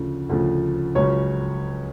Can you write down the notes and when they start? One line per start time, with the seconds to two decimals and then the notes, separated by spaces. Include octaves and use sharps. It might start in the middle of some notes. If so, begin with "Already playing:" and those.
Already playing: D2 C#3 F3
0.29 D2 C#3 F3
0.95 C#2 C#3 F#3 C#4 C#5